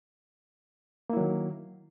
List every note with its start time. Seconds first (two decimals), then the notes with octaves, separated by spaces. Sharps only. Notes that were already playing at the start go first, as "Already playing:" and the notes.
1.10 A#3
1.13 E4
1.17 F#3
1.20 D#3